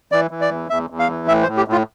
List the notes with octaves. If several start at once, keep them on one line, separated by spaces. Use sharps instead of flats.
E3 D5
E3
D5
E2
E2 E5
E2
F5
E3
A2 E5
C5
A2
G4
A2 F4